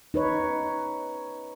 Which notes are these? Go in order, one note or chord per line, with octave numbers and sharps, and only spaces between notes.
D#4 B4 C#5